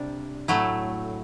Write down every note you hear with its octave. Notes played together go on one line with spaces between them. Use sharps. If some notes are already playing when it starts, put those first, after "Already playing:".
Already playing: C3 G3 D4
A2 F#3 A3 E4